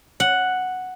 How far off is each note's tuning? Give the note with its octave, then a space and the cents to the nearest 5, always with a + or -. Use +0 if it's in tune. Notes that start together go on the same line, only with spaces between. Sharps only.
F#5 +0